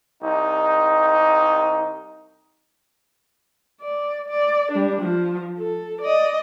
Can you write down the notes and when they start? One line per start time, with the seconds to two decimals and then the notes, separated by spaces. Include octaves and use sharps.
0.23 C2 D#4
3.81 D5
4.28 D5
4.72 G3 D4
5.01 F3
5.58 A4
6.01 D5 D#5